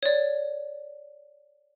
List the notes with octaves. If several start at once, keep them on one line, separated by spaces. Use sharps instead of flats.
C#5 D5